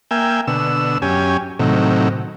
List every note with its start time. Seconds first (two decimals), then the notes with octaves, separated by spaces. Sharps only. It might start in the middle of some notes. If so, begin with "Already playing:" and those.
0.11 A#3 E5 G5 G#5
0.47 B2 D3 E6
1.02 F#2 C#4 G4 G#5
1.59 A2 C3 D#3 F#3